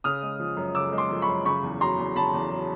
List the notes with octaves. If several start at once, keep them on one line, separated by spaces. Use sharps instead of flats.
C#3 D#6 F6
G#3
F3
F#2
C#3 D6 E6
G#3
C6 D6
F3
B5 C#6
F#2
C#3 B5 C#6
E2
F#3 A#5 C6
E2
C#3 A5 B5
E2
F#3